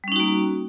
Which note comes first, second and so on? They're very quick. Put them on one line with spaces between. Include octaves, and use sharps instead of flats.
G3 C#4 D#4 F#4 A#3